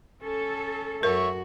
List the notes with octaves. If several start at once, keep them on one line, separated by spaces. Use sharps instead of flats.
C#4 A4
F#2 F#4 A#4 C#5 E5